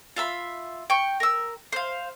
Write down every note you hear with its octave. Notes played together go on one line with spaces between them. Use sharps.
F4 E5 B5
G5 C#6
A#4 E6
C5 F5